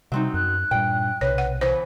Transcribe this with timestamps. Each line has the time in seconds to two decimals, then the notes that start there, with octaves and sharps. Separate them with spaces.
0.12 C3 F#3 G3 C4 D#4
0.34 F#2 F#6
0.71 G2 A#2 G5
1.21 B1 C3 B4 C#5
1.38 F#5
1.61 C#3 E3 B3 C5